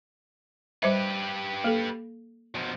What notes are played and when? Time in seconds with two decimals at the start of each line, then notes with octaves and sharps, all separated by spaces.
0.83 G3 G4 B4 C5 E5
1.64 A#3 A4
2.54 B2 F3